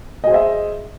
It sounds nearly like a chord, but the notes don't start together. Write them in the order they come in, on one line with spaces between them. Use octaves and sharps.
D#5 G#4 C5 E5